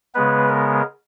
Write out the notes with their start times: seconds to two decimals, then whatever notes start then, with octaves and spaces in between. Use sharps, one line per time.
0.14 C#3 G#3 B3 B4
0.48 A#4